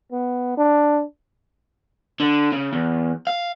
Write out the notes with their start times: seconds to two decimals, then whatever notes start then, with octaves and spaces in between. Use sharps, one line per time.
0.12 B3
0.57 D4
2.20 D3
2.52 C#3
2.73 E2
3.27 F5